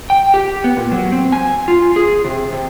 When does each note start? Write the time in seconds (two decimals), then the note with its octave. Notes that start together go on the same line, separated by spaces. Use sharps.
0.10 G5
0.34 G4
0.64 B3
0.77 A#2
0.92 F#3
1.12 C4
1.32 G#5
1.68 F4
1.96 G#4
2.25 C3
2.53 C3